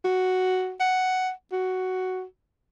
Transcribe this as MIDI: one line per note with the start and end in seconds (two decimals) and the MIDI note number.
0.04 0.74 66
0.80 1.31 78
1.52 2.23 66